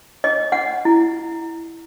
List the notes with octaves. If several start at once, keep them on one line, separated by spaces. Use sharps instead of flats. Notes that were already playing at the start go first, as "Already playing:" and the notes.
D#5
F#5
E4